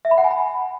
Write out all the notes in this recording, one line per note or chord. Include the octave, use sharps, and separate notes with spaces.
E5
B5
F#5
G#5
B5